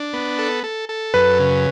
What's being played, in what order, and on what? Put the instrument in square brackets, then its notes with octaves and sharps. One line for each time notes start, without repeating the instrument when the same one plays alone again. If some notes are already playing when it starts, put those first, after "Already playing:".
Already playing: [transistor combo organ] D4
B3
A4
A4
A4
[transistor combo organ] F#2 [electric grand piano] B4
[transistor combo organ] C#3